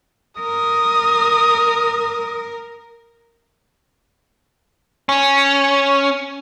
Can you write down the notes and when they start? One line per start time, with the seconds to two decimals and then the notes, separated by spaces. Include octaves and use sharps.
0.41 A#4 D#6
5.09 C#4